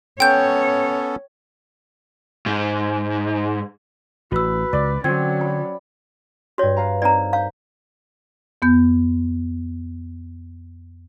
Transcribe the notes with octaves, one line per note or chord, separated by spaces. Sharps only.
B3 C#4 A4 C#5 G5 G6
G#2
A1 F#4 B4 E6
C#2 D5
D3 F#3 C4 C#4 G#6
B5
G2 F#4 C#5 G#6 A#6
B4 F5 A#5
C4 D#4 A#4 D5 A#5
F5 G6
F2 B3 G6